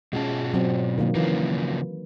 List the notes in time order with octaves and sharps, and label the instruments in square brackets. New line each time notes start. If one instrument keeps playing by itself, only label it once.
[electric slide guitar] B2 F4 A5 [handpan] G#3 C#4
[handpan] F#3 C4
D#3 F#3 A#3
[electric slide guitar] C#3 F3 A#3 [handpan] E3